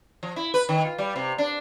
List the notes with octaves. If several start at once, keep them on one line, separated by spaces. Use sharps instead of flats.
F3
E4
B4
D#3
F4
G3
C3
D4